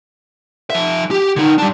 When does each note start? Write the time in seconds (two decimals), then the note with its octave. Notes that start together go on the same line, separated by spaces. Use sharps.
0.70 F3 E5
1.11 G4
1.36 D3 D#4
1.58 G3 D4